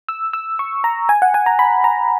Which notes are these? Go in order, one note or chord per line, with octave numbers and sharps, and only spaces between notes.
E6
E6
C#6
A#5
G#5
F#5
G#5
A#5
B5
A#5